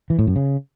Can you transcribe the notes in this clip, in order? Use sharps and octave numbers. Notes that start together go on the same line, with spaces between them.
E3
A2
F#2
C#3